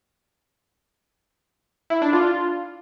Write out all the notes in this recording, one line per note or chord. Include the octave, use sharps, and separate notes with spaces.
E4
D4
F4